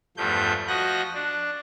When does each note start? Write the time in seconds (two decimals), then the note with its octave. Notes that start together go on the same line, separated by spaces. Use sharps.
0.17 E2 G2 F3 A3 G6
0.68 F3 F#4 D#5 F#6 A#6
1.15 D4